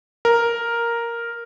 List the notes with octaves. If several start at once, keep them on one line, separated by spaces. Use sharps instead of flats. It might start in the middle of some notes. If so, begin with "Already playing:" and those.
A#4